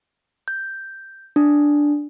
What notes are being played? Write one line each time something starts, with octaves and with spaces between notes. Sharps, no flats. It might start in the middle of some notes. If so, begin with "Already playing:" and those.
G6
D4